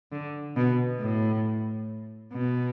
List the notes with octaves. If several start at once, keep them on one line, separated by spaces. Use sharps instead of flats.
D3
B2
A2
B2